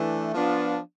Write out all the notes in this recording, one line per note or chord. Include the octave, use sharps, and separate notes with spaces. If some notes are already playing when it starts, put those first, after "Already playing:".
Already playing: E3 A3 D4
F3 B3 D4 F4